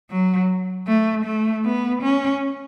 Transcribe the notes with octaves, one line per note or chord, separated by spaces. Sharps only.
F#3
A3
A3
B3
C#4